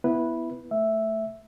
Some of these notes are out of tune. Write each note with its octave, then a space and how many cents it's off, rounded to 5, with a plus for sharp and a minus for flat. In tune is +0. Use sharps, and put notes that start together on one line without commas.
B3 +0 E4 +0 B4 -10
A3 +0 E5 +0